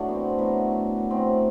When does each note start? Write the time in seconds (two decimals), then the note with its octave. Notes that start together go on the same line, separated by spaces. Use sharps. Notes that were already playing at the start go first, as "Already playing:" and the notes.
Already playing: A2 F#3 D4 F#4 A4
0.08 B3
0.14 C4
0.39 A2 F#3 B3
1.11 A2 F#3 C4